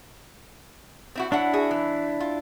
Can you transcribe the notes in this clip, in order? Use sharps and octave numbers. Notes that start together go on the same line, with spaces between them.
C4 E4 F#4
F#3 D4 E4 E5 F#5
F#4 G#4
E3
F4